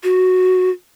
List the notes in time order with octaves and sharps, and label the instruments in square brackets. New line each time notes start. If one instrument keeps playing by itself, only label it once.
[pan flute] F#4